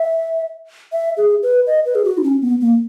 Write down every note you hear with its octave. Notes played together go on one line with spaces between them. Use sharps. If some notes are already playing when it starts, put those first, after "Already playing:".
Already playing: E5
E5
G#4
B4
D#5
B4
G#4
F#4
D#4
C#4
B3
A#3